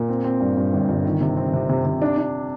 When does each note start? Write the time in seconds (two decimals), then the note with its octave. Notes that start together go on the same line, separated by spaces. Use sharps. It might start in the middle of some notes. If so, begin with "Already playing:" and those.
Already playing: A#2
0.09 C4
0.24 C4
0.40 G2
0.57 G2
0.73 G1
0.89 G1
1.04 D#3
1.21 C3
1.37 C4
1.53 C3
1.69 C3
1.85 C3
2.02 D4
2.17 D4